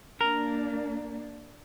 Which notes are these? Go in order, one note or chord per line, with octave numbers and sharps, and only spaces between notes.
A#3 D4 A#4